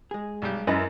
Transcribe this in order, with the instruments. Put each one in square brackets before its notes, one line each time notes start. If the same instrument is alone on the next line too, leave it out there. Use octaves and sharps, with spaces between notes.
[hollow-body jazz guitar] G#3 G#4
[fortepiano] B1 G3 G4
[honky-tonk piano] F#2 [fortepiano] E4 B4 D#5